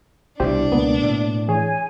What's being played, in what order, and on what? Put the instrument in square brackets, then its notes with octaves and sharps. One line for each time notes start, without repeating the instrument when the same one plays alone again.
[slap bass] C2 B2 G3 [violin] D4 [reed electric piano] E4 G4 C5
[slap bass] C#2 [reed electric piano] B2 A#3 B3
[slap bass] A2
[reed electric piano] E3 G#4 C#5 [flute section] G#5